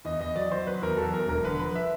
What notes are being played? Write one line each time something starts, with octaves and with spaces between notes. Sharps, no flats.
E2 D#5
E2 D#5
F#3 D5
F#3 C5
F#3 B4
E2 A#4
F#3 A4
E2 A#4
E1 A#4
D3 B4
F3 B4
E5